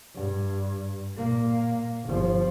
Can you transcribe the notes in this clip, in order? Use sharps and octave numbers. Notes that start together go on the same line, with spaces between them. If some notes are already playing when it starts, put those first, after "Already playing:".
G2
A#2 A#3
G1 F3